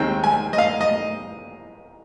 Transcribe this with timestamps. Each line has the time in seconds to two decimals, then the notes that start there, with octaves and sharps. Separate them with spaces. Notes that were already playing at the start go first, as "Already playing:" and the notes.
Already playing: D#2 D#3 G#3 C4 G5
0.24 G#5
0.53 D#5
0.58 F5
0.81 D#5